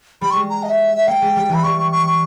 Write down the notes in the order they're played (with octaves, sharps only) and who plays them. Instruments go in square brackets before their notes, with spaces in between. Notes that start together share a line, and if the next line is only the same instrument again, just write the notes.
[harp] G3 [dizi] B5
[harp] G#3 [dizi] C#6
[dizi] A#5
D#5
E5
E5
[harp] A#3 [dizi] G5
[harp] G#3
G3
[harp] E3 [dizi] B5
[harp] G3 [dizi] C#6
[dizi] C#6
C#6
C#6